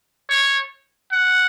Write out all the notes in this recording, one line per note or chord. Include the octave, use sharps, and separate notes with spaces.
C#5
F#5